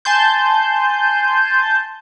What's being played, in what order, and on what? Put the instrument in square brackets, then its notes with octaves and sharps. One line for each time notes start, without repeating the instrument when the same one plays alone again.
[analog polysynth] G#5 A5 C6 G6